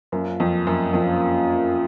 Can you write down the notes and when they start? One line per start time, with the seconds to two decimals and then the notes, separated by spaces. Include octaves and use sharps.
0.12 F#2 A#2 F3 A#3 C#4
0.40 F2
0.67 F#2
0.94 F2 A#2 F3 A#3 C#4